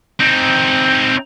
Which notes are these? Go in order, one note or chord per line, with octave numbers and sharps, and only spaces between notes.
C4 D#4